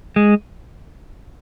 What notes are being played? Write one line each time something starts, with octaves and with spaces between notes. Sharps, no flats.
G#3